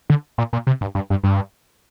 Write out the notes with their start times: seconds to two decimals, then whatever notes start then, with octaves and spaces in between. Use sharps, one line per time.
0.10 D3
0.38 A#2
0.53 A#2
0.67 C3
0.81 G2
0.95 G2
1.10 G2
1.23 G2